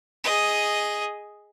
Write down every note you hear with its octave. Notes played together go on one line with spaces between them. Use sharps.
G#4 D#5